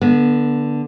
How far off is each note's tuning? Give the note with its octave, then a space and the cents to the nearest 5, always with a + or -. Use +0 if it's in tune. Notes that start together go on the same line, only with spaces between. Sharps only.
D3 +0 B3 -25